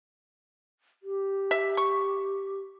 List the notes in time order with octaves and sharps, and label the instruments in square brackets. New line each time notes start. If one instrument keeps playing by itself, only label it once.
[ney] G4
[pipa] E5
C#6